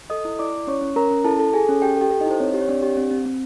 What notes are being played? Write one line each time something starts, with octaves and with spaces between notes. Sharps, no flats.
A4 D#5 D#6
E4
E4 D5 D6
E4
C#4 C#5 C#6
C#4
C#4 A#4 A#5
C#4
E4 A4 A5
A4
G#4 A4 G#5
C#4
G4 A4 G5
G4 A4 G5
A4
D#4 D#5
E4 C5
C4 C#5
G4
C#5
C4 D4 D5
G4
C4
C4
C4